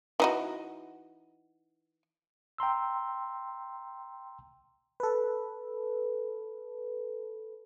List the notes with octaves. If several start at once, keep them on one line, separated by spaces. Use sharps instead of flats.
E3 D#4 F#4
G5 A#5 C6 E6
A4 B4